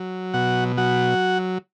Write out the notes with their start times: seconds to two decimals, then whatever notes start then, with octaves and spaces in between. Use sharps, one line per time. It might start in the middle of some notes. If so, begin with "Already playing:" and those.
Already playing: F#3
0.34 B2 F#4 F#5
0.77 F#3 F#4 F#5